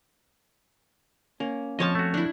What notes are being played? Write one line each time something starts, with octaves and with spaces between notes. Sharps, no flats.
A#3 C#4
F2 F3 C#4 C#5 D#5 A5
A3 F#4
D4 E4